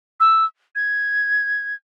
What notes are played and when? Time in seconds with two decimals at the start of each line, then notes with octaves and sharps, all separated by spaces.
0.20 E6
0.75 G#6